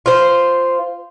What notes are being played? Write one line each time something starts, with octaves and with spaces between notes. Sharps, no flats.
F4 C5